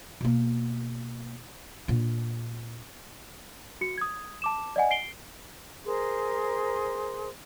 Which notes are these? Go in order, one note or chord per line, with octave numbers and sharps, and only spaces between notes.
B2 A#3
A#2 D4
F#4 C#7
D#6 G#6
A5 D6 E7
D5 D#5 F#5 G#5
C7 D7 G7
G#4 A#4 C5 C6